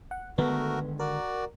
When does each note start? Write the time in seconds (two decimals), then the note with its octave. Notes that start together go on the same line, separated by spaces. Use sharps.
0.11 F#5
0.38 D3 D#3 G#3 A3 B3 F#4 A#4
0.99 F#4 A#4 D5